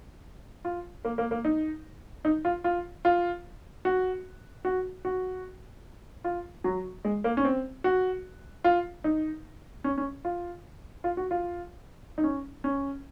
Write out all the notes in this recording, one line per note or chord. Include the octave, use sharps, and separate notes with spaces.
F4
A#3
A#3
A#3
D#4
D#4
F4
F4
F4
F#4
F#4
F#4
F4
F#3
G#3
A#3
C#4
C4
F#4
F4
D#4
C#4
C#4
F4
F4
F#4
F4
D#4
C#4
C#4